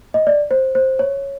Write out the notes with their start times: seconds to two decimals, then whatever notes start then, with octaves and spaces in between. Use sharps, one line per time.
0.14 D#5
0.27 D5
0.51 C5
0.75 C5
0.99 C#5